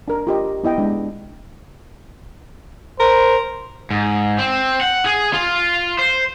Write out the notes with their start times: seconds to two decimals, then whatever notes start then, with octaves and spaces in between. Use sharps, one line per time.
0.08 D4 A#4
0.27 F4 G4 D#5
0.63 B3 E4 D#5 G5
0.78 G#3 D4
3.00 A#4 C5
3.91 G#2
4.39 C4
4.81 F#5
5.06 G#4
5.33 F4
5.99 C5